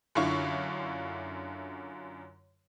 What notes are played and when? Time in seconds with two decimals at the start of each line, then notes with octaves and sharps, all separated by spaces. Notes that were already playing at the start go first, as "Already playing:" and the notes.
0.15 F#2 D3 E4 F4 C#6